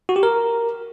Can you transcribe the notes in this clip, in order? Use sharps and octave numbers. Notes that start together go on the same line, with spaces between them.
F#4
G4
A#4